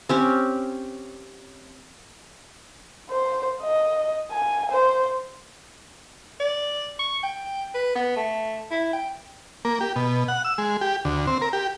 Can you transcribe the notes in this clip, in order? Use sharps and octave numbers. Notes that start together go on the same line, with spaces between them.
C4 C#4 G4
C5
D#5
G#5
C5
D5
C#6
G5
B4
B3
A3
E4
G5
A#3
G4
B2
F#5
E6
G#3
G4
D2
C4
A#4
G4